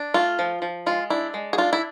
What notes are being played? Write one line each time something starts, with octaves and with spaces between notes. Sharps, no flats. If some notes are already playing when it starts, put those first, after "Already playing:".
Already playing: D4
A3 F4
F3
F3
G#3 F4
D4 E4
G#3
G#4
D4 F4
E4